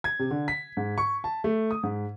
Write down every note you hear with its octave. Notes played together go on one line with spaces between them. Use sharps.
G#6
C3
D3
B6
G#2
C#6
A5
A3
D#6
G#2